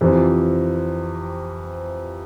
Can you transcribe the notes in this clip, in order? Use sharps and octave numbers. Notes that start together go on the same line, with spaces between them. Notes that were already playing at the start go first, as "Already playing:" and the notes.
F2 C3 E3